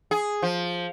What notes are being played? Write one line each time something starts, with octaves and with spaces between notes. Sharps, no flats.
G#4
F3